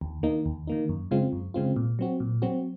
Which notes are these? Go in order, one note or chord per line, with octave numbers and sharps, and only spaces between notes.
D#2
D#3 A#3 D#4
D#2
D#3 A#3 D#4
F#2
C#3 G#3 C4 F4
F#2
C#3 G#3 C4 F4
A#2
F#3 C4 F#4
A#2
F#3 C4 F#4